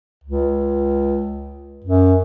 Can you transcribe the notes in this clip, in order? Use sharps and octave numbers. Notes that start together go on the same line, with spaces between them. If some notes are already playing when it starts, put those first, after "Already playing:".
C#2
F#2